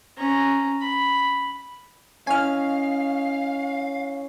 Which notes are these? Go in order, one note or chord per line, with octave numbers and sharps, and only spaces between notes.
C#4 A#5
B5
C#4 E4 D#5 F5 G#5 F6